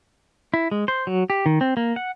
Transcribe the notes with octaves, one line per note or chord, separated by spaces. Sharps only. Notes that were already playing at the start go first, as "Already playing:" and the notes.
E4
G#3
C5
F#3
G4
D#3
C4
A#3
F#5